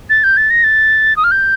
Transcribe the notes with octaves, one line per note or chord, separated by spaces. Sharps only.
A6
G6
A6
A#6
A6
D#6
F6
G6